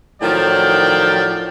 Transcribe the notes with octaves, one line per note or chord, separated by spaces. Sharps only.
A2 D#3 F3 F#3 D5 G5